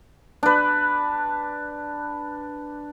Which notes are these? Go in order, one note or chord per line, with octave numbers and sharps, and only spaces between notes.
D4 B4